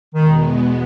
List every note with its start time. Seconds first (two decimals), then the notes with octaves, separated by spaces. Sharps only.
0.15 E2 B2 D#3 G#3 B3